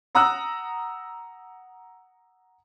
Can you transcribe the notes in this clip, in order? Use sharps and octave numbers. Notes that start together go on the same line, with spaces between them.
F#5 A#5 D#6 E6 F#6